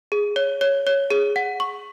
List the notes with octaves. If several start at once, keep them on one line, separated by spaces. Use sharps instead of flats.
G#4
C#5
C#5
C#5
G#4
F#5
C#6